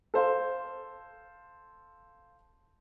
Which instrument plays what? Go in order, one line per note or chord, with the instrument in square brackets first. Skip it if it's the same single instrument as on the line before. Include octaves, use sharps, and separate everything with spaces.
[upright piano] A4 C5 F5